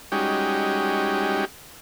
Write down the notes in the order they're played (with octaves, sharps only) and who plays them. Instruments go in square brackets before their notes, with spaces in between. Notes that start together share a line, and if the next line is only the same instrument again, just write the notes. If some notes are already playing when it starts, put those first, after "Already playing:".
[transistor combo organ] G3 G#3 C#4 D#4 F#4 G4